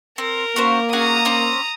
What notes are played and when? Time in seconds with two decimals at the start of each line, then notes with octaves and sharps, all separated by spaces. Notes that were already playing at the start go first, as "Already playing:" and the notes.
0.18 C4 A#4
0.56 A#3 C#4 F#4 C5
0.93 C#4 F#4 G#4 A#5 D#6
1.25 C4 C#4 D5